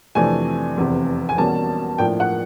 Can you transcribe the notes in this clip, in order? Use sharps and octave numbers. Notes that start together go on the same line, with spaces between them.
F2 C3 E3 A3 D4 G#5
F1 E2 C3
G#5
E2 B2 G3 A#3 C#4 A5
A2 F3 A#3 D4 G5
F#5